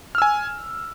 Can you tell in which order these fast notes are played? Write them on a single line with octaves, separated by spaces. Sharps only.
F6 E6 G#5